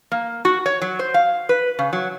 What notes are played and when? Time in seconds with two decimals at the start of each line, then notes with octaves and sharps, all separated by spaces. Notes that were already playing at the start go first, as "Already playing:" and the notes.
0.12 A#3
0.45 F#4
0.66 C#5
0.82 F#3
0.99 C5
1.14 F5
1.49 B4
1.79 C#3
1.93 F#3